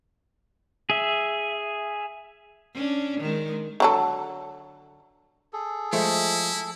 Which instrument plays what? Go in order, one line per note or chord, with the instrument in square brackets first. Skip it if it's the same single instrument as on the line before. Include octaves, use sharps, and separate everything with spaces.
[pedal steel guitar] G#4 E5
[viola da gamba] C#4 D4
D#3 G#3
[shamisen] D3 F#3 A4
[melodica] G#4 A4
[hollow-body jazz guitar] F3 G#3 A3 [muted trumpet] E4